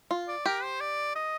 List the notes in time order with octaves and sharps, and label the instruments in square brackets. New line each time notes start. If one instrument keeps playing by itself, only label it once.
[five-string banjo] F4
[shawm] D5
[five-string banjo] G4 [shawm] A#4
[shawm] C5
D5
D#5